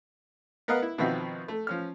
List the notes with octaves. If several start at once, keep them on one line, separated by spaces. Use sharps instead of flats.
B3 A#4 B4 D#5 F5 F#5
E4
B2 D#3 F3 C4 F#4 E5
A3
F3 C#4 F6